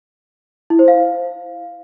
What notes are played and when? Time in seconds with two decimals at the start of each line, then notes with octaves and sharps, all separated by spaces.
0.70 E4
0.79 C5
0.88 F5